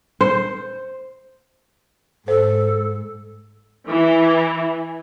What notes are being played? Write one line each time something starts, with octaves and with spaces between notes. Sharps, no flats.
C5
G#2 A4 C5
E3